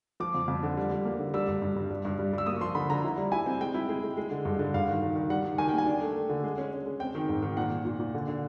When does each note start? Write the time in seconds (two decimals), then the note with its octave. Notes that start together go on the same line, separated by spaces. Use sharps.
0.20 F3 D6
0.35 F2
0.48 F2
0.63 D3
0.77 G3
0.91 G3
1.05 A#3
1.19 D3
1.34 G3 E6
1.47 G2
1.62 G2
1.76 G2
1.90 G3
2.05 G2
2.19 G3
2.33 G3 E6
2.46 A#3 D#6
2.57 C#6
2.61 F3 C6
2.75 D3 B5
2.90 D3 A#5
3.04 E4
3.18 G3
3.32 E4 G#5
3.46 C4
3.61 G#3 G5
3.74 E4
3.89 G#3
4.03 G#3
4.17 G#3
4.31 D3
4.45 G2
4.59 D3
4.74 G2 F5
4.87 D#3
5.03 D#3
5.16 D#3
5.30 G3 F#5
5.45 D#3
5.58 D#3 G#5
5.68 A#3 G5
5.78 G#5
5.86 D4
6.01 A3
6.16 A3
6.30 D3
6.44 G#3
6.58 C#4
6.72 C#4
6.86 G#3
7.00 C4 G5
7.15 D#3
7.29 G#2
7.42 D#3
7.57 A#2 F#5
7.71 A#2
7.85 A#2
8.00 A#2
8.14 D3
8.28 D3